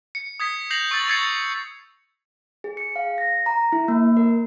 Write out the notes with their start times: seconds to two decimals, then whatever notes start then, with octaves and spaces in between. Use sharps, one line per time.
0.15 C#7
0.40 D#6 G#6 B6
0.70 G6 A#6 C7 F7 F#7
0.91 C#6 E6 A6 F#7
1.08 C#6 E6 G#6 A6 C7 C#7
2.64 G#4
2.77 C#7
2.96 F5
3.18 A#6
3.46 A#5
3.73 E4
3.88 A#3
4.17 A#4